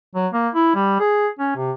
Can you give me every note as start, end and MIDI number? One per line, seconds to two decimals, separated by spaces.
0.15 0.28 54
0.33 0.49 58
0.55 0.73 64
0.75 0.96 55
1.00 1.28 68
1.39 1.52 61
1.56 1.72 48